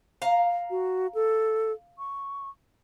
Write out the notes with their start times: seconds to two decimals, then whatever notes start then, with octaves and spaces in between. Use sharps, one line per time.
0.22 F5 A#5
0.70 F#4
1.15 A4
1.98 C#6